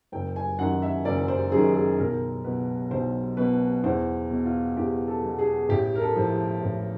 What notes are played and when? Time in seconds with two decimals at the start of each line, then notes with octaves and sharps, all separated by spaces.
0.12 F#1 G5
0.36 G#5
0.58 F#2 D#3 F#5
0.82 E5
1.05 F#1 D5
1.28 C5
1.52 F#2 D#3 G#4
1.75 G#4
1.98 B1 A#4
2.44 B2 B4
2.91 B1 C5
3.37 B2 B4
3.84 E2 C5
4.30 B2
4.46 F4
4.77 E2 G4
5.08 A4
5.23 B2
5.39 G#4
5.69 A1 G4
5.95 A#4
6.01 A4
6.16 A2 F3
6.63 A1